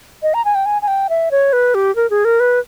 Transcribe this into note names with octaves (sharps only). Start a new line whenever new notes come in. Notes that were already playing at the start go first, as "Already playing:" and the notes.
D#5
A#5
G#5
G5
G#5
G#5
G5
E5
C#5
B4
G4
A#4
G#4
A#4
B4